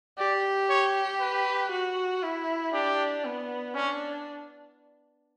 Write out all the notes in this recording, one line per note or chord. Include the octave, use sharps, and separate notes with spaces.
G4 D5
C#5
B4
F#4
E4
D4 G4
B3
C#4 D4